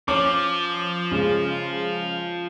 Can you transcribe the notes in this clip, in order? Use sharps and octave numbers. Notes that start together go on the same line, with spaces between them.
F3 C#4 D6 F7
C#3 G#3